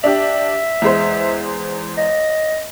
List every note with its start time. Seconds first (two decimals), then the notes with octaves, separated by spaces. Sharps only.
0.04 D4 G4 E5
0.82 E2 G#3 C5
1.98 D#5